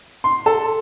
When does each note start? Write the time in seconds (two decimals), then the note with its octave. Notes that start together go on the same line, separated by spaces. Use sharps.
0.24 C6
0.46 A4